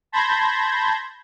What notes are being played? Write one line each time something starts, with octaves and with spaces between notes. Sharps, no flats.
A5 B5 C6 G6 G#6 A#6